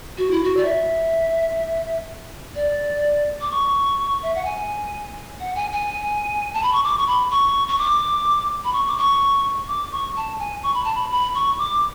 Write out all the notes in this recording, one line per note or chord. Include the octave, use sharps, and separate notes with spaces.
F#4
E4
F#4
D5
E5
D5
D6
C#6
E5
F#5
G#5
F#5
G#5
G#5
A5
B5
C#6
D6
C#6
B5
C#6
C#6
D6
B5
C#6
D6
C#6
D6
C#6
A5
G#5
C#6
B5
A5
B5
B5
C#6
D6